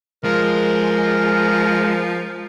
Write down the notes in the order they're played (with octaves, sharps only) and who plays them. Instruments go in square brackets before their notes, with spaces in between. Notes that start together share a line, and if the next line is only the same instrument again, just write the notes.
[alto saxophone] F3 [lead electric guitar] G#3 [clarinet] A#4